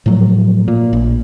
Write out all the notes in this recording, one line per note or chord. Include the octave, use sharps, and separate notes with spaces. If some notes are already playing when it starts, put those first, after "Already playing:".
A2 F3 F#3 A3
A#2
A#1